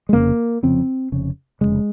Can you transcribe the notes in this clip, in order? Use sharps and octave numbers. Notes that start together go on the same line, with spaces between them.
G#3
F1 F2 C#3 A#3
F1 F2 C#3 C4
F1 F2 C#3
F1 D#2 C#3 G#3